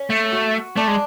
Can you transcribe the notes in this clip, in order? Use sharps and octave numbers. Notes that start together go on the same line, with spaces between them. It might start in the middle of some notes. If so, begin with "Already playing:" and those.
Already playing: C#4
A3
F#4
A3 D4
G#3